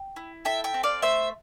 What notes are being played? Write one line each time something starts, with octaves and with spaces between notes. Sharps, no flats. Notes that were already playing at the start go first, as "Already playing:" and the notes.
Already playing: G5
E4
A4 E5 G5
E5 G5
C4
D5 F5
A3 C5 E5